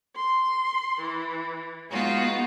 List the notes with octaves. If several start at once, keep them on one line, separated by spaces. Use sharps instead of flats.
C6
E3
G#3 B3 D#4 F4 F#4